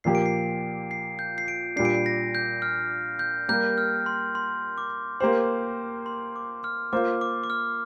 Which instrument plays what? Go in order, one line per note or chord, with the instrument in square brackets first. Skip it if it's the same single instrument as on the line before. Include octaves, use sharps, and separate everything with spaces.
[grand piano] A#2 F3 A#3 G4 [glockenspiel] C7
[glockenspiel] D7
C7
C7
G6
C7
D7
[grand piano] A#2 G3 D4 [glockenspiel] C7
[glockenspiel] D7
C7
A#6
G6
F6
G6
[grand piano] G3 A#3 G4 A#4 [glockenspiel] G6
[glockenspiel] F6
C6
C6
D6
[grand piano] A#3 G4 C5 [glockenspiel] C6
[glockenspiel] C6
D6
F6
[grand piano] A#3 F4 C5 [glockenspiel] D6
[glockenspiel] D6
D6
F6